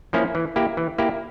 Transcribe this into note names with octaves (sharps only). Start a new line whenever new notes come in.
F3 A#3 C#4 E4
E3
A#3 E4 G4
E3
A#3 E4 G4